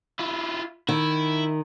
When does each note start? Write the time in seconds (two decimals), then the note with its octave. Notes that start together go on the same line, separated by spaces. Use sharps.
0.19 E4 F4
0.89 D#3 E4